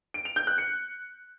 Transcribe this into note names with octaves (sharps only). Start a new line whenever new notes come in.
D7
F7
G6
F#6
C#7